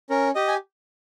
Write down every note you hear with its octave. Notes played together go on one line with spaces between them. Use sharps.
C#4 A#4
G4 D#5
G#5